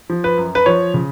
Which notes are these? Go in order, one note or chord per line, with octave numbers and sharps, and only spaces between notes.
F3
B4
F#2
B4
F3 C#5
C#3